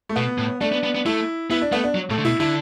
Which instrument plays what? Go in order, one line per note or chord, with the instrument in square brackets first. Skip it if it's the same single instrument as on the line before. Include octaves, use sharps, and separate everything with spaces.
[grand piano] A3
[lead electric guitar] B2 [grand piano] B3
[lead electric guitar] A2
[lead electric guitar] A3 [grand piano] D4
[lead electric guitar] B3
B3
B3
[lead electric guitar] A3 [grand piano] E4
[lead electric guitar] B3 [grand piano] E4
[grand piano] D4
[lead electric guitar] A3 [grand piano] B3
[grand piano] D4
[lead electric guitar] F#3
[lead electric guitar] A2 [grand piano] A3
[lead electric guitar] D3
[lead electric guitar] B2 [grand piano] E4
[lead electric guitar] D3 [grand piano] E4